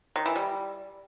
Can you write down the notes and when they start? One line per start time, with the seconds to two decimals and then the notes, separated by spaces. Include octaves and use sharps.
0.16 D#3
0.26 E3
0.36 G3